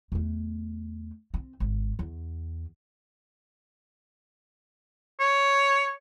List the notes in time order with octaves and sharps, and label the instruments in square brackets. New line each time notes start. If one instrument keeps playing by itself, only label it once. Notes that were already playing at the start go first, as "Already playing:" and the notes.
[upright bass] E2 A3
C4
G#1
E2
[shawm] C#5